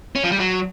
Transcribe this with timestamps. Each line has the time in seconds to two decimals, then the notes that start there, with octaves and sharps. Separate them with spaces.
0.15 C#4
0.24 F3
0.32 G3
0.40 F#3